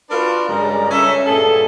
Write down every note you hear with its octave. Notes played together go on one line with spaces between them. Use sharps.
D4 F4 F#4 A#4 B4
G2 C#3 G3 G#3 A#4 A#5
C#4 A4 E5
G2 A#2 G#4 A4